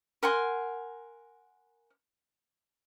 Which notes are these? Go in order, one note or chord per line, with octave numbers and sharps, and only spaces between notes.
A#4 F#5 G#5 C6